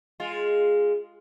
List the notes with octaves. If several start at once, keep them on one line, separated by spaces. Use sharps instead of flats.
G#3 F4